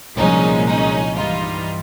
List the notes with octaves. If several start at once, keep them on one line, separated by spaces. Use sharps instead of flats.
C2 A#2 F3 G#3 C#4 D#4
C#4 D#4
G2 E3 G3 D#4 F4